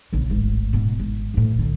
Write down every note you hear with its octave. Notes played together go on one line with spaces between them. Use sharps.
A#1 C#3
D1 G#1
G#2 B2
G#1
D2 A2
B1 D3